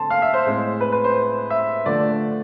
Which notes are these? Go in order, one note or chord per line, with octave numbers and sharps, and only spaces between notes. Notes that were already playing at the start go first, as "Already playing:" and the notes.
Already playing: D3 A3 C4 A5 C6
F5
E5
C5
A2 G#3 C4
B4
B4
C5
E5
D3 F3 A3 D5